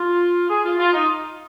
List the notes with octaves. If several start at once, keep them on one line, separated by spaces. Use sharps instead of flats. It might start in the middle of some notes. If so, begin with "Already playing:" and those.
Already playing: F4
G#4
F4
F4
D#4